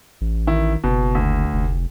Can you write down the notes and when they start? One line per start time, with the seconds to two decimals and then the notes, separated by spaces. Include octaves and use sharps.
0.21 A1
0.47 D#3 E4
0.84 F#1 B2
1.15 D2
1.53 F1